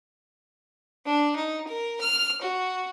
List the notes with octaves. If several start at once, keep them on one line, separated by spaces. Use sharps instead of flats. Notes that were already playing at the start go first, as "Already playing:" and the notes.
D4
D#4
A#4
F6
F#4